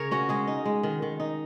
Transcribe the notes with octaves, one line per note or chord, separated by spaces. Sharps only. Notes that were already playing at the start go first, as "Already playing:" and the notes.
Already playing: C#3 A#4 C#5
C#4 F#4
G#3 G#4
D#4
G#3
D#3
D#3
D#4